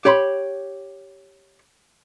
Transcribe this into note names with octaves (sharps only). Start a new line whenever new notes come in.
G4 C#5 B5 C6